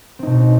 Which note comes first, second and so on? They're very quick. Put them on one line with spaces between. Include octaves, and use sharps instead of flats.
C4 D#4 B2